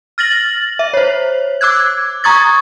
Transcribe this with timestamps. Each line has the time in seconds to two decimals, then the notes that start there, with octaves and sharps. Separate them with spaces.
0.18 F6 A6 A#6 F#7
0.79 E5
0.94 C5 C#5
1.61 D6 E6 F#6 G#6
2.24 A#5 C#6 D#6 G#6 A6